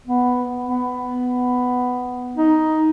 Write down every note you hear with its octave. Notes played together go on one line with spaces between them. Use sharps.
B3
B3
D#4